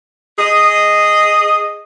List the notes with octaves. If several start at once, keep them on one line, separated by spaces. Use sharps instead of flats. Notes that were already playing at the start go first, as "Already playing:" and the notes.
G#4 D#5